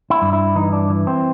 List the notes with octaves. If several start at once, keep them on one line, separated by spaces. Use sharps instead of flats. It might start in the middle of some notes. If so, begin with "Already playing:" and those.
E4
G2
E4
E3 D#4
D4
E3
C4